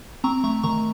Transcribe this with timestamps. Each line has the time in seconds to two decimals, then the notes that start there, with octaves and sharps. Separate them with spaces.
0.24 C4 A#5 C#6
0.44 A3 A#5 C#6
0.63 D#3 A#5 C#6